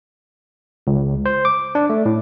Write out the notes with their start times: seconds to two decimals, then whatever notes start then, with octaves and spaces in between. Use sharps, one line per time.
0.87 C#2
1.26 C5
1.45 D6
1.75 D4
1.90 A3
2.05 A2